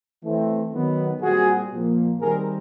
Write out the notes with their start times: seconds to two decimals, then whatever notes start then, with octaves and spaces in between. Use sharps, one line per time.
0.23 E3 A3 C4
0.72 D#3 F#3 B3
1.22 A#2 G3 C4 F#4 G#4
1.71 A#2 F3 A#3
2.21 D#3 G3 C4 G#4 A#4